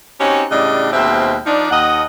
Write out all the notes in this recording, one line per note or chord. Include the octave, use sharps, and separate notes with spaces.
C4 C#4 D#4 F#4 G4 C#5
A2 C#3 G3 D4 D#5
D#2 B2 G#3 C4 C5 E5
F3 D4 D#4
D#2 D#5 F#5